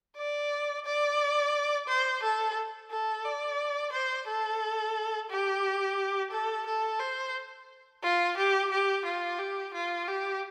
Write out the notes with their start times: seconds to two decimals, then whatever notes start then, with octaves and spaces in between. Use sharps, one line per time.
0.17 D5
0.85 D5
1.88 C5
2.23 A4
2.91 A4
3.25 D5
3.93 C5
4.27 A4
5.30 G4
6.32 A4
6.67 A4
7.00 C5
8.03 F4
8.37 G4
8.71 G4
9.05 F4
9.39 G4
9.74 F4
10.08 G4